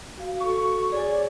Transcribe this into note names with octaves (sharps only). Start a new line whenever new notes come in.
F#4 F5
F#4 A4 C#6
G#4 C#5 D5 G#5